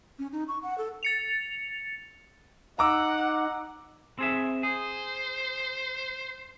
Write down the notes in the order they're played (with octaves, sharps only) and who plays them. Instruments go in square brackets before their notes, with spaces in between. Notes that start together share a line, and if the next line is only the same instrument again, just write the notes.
[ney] C#4
D#4
C#6
F#5
A4
[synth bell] A6 C#7 F7
[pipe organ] D#4 [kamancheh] F#5 [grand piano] A#5 D6 E6
[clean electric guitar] C4 G#4 E5
[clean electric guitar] G#4 [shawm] C5